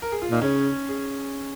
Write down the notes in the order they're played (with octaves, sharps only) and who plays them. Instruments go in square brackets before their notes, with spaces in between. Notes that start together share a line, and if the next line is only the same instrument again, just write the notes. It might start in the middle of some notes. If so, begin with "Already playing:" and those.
[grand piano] A#4
G#4
F4
[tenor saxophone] A#2 [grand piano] D#4
[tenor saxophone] C#3 [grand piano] C#4
[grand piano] G#4